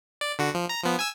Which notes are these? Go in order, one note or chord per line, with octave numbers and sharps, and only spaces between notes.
D5
D3 F#4
F3
A#5
F3 B3
G#5 E6